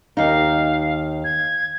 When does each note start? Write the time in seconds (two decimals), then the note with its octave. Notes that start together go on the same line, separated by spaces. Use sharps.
0.17 D#2 D#4 F5
1.24 G#6